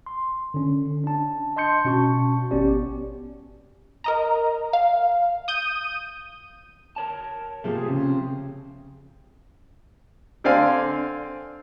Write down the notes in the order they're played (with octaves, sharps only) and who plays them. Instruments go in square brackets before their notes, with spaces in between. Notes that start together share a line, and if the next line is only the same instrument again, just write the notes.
[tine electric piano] C6
D3 C#4
D4 A5
D#5 A5 C6 G6 C#7
B2 C#4 F#4 A5 C#6
G#1 B3 C#4 G4 D5
[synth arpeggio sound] A#4 D#5 A#5
F5
D#6 G6 D#7
[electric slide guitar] A#4 C#5 A5
[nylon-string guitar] C3 F3 G4 [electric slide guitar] A3 A#3 [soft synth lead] G#4
[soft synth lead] C#3 [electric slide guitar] C4
[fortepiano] D3 C4 D5 F5 G#5